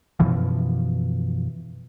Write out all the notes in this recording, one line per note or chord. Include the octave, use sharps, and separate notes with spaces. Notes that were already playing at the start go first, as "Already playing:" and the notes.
F#2 B2 E3 F3